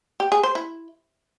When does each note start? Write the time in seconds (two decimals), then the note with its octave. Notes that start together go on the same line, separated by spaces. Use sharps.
0.20 G4
0.32 G#4
0.43 C5
0.55 E4